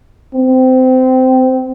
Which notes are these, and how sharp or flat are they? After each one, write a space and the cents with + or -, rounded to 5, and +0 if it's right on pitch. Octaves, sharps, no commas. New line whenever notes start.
C4 -20